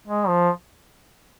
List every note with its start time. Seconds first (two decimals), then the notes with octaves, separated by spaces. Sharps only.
0.07 G#3
0.28 F3